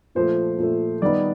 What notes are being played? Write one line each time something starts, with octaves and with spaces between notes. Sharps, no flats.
A#2 F3 A3 C5
A#2 F3 A3
D#3 G3 B3 D#4 D5